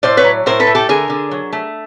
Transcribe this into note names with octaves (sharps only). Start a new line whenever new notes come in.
A2 C5 D5
B4 C#5
F#3
A2 A#4 C5
A4 B4
A3
G4 A4
D3 G#4 A#4
D3
F#3
A3